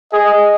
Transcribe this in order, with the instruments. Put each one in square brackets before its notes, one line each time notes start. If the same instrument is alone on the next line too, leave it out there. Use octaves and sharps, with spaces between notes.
[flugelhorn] G#4 [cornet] D#5